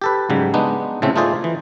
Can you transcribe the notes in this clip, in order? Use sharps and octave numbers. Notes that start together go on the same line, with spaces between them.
G4 A4 B4
G#2 C#3 F#3 G3
G#3 B3 D4 D#4
A2 C#3 A3 C4
A3 D#4 F4 G#4 C5 D5
E3